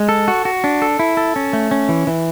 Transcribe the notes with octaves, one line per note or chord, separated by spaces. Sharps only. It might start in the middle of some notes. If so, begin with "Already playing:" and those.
Already playing: G#3
A4
F#4
F#4
D4
A4
E4
A4
C#4
A3
C#4
E3
E3